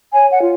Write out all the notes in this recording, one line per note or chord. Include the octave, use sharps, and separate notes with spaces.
C#5 G#5
F#5
F4